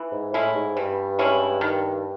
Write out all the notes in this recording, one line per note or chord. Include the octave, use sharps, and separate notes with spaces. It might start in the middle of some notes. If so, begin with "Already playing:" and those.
Already playing: E3
G#2
A2 G#3 C#4 E4
G#2
G2 E3
G#3 C#4 E4
D#3